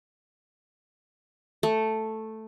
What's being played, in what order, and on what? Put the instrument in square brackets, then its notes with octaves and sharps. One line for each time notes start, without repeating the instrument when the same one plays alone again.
[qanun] A3